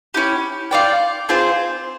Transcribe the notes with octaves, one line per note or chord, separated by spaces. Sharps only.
C#4 E4 G4
F4 A4 D5 G5
C4 F4 G#4 C5